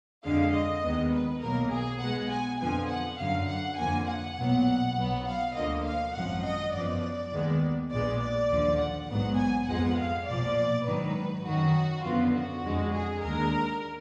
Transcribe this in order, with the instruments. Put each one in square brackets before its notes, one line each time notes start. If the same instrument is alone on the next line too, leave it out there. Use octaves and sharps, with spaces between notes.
[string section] F2 D3 G#3 F5
D#5
D#2 D#3 G#3 B3
B4
B1 B2 F#3 A#3 A#4
G#4
B1 B2 G#3 B3 F#5
G#5
F2 D3 F3 B3 G#5
F#5
F#2 D3 F#3 F5
F#5
F2 D3 F3 A#3 G#5
F#5
B1 A#2 F#3 B3
B1 B2 F#3 B3
F5
D2 D3 F3 A#3 D#5
F5
G#1 F#2 F3 F#5
D#5
F#2 F3 B3 D5
D#2 D#3 G#3 B3
A#1 A#2 G#3 B3 D5
D5
D#2 D3 F3
F#5
A#1 G#2 F#3 B3 F#5
G#5
F2 F3 G#3 B3 F#5
F5
B1 A#2 F3 D5
G#2 D#3 F#3 B4
F#2 D#3 F#3 F#4
F#2 D3 F3 B3 F4
F#4
F2 D3 G#3
G#4
D#2 D3 G#3 A#4